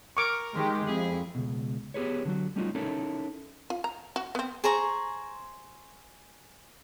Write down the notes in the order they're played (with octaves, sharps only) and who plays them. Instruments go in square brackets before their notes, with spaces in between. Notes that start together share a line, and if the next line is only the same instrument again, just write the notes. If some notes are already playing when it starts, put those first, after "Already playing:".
[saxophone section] A#4 [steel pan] C#6 D6
[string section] D#3 G#3 G4
[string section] F2 [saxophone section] E4 G#4
[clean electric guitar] C#2 F#2 B2
B3 G4 G#4 B4 C#5
D3 F#3 F#4
G3 A3 C#4 D#4 F4 F#4
C#4 D#4 E4 A4 A#4 C#5
[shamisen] F4
A#5
F#4
B3 C4
[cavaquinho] G#4 C5 A#5 C#6